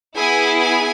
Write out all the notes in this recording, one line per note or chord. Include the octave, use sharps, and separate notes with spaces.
B3 E4 G#4 G#5
G#5